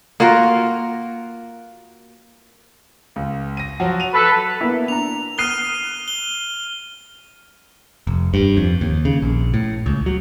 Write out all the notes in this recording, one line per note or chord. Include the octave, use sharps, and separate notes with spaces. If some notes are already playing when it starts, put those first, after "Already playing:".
A#3 F4 F#4 A#4
C#2
A#6 D#7
F3 F#3 F#4
D#7 F7
A4 B4
A#3 B3 E4
D4 A#5 F7
D#6 F6 F#6 C7 D#7 G7
G7
F1
G2
F2
D#2
C#3
A#1
A2
C#2
F#3